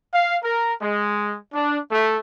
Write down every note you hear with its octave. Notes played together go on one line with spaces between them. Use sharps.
F5
A#4
G#3
D4
A3